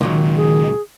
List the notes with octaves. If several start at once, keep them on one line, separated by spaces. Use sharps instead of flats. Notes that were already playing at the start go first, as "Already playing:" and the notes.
C#2 A#2 D#3 F#3
G#4